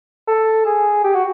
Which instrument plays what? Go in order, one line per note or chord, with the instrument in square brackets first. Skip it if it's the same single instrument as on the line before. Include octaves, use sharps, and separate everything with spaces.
[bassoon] A4
G#4
G4
F#4